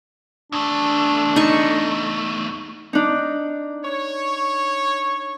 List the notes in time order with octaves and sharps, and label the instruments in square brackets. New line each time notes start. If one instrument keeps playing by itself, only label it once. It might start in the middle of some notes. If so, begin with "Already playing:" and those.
[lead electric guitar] E2 A3 [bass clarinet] D4
[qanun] D#4 A5 C#6
[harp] D4 D#4
[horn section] C#5